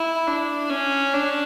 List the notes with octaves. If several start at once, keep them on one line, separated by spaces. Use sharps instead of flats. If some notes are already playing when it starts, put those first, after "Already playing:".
Already playing: E4
D4
C#4
D4